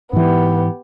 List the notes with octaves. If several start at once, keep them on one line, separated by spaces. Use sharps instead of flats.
G#2 E3 B3 G4